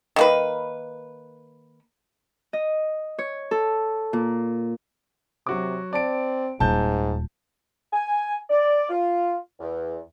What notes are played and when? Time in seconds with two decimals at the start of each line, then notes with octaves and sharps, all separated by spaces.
0.16 D#3 A#3 B4
2.53 D#5
3.19 C#5
3.51 A4
4.13 A#2
5.47 C3 F#3 F#4 D6
5.93 C4 D5 A5 D7
6.60 D#1 G#2 A5 G6
7.93 G#5
8.50 D5
8.90 F4
9.60 E2